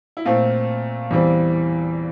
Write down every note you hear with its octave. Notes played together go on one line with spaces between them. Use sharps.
E4
A#2 A3 C4 F4
E2 E3 G3 C4